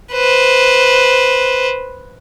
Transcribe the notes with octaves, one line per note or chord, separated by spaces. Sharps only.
B4 C5